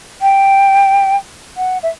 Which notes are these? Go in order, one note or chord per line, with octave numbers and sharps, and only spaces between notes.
G5
F#5
E5